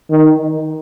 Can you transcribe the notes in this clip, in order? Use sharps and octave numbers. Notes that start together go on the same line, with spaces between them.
D#3